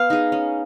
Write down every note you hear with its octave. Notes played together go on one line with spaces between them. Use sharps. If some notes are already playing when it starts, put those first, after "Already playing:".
Already playing: B3 F5
D#4 G#4
C#4